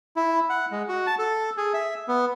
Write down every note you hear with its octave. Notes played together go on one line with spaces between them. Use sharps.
E4
F#5
G#3
F#4
A5
A4
G#4
E5
B3